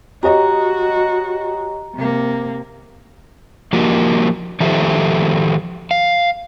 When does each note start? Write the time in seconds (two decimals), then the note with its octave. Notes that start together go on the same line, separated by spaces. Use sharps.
0.23 F#4 G4 C#5 D#5 A#5
1.95 C3 A#3
3.73 F3 A#3 F#4 G4 A#4
4.60 D#3 F3 G4 A4 C5 E5
5.91 F5